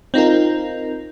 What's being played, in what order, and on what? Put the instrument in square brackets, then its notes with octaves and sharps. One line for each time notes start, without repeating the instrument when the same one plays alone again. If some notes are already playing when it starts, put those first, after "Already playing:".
[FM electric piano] C4 D#4 F4 A#4